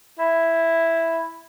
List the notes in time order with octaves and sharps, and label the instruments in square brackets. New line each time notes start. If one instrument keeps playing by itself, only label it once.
[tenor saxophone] E4